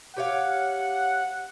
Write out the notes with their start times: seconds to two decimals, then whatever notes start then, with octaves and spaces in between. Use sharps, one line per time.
0.17 G4 C#5 F5 F#5